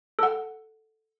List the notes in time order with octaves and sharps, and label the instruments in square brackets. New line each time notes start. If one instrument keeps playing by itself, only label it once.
[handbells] A4 F#5